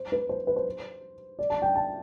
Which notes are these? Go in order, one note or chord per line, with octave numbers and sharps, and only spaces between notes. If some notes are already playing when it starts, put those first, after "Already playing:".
Already playing: C5
B4
C5
B4
C5
D5
A5
G5
A5